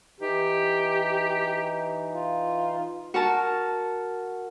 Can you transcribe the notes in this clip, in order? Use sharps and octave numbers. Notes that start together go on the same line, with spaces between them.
E3 D#4 G4
F4
F#4 A#4 A5